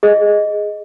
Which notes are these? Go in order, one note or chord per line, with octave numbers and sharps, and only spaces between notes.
G#4 D#5